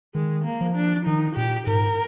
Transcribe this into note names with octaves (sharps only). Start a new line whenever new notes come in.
D#3 G#3
A#3
F3
D4
D#3 D#4
A#2 G4
G#2 A#4